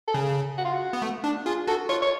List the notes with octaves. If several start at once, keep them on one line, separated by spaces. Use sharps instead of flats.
A4
C#3 G#4
F#4
F4
F#4
B3
A3
D4
F4 G#4
F#4 A4
F4 C#5
C#5